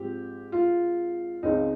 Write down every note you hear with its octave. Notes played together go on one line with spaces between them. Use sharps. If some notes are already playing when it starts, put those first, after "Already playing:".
Already playing: G#2 F3 C4 G4
F4
C#2 C#3 G#3 C4 D#4